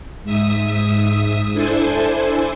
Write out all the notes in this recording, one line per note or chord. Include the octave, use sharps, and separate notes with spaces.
G#2 E5 D#6
D4 E4 A4 C5 G#5